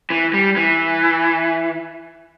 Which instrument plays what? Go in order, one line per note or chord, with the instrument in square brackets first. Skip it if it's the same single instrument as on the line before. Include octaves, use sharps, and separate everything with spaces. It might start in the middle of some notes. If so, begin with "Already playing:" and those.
[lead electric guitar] E3
G3
E3